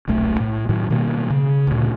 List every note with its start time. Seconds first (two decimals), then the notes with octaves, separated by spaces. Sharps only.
0.08 D#1 B1 A3
0.40 A2
0.69 A2 D#3 F#3
0.90 B2 D#3 G3 A#3
1.30 C#3
1.67 D2 A#2